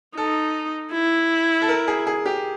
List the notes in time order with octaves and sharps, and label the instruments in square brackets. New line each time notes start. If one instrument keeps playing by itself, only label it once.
[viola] D#4 [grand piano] A4
[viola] E4
[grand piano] A4
A#4
G#4
G#4
G4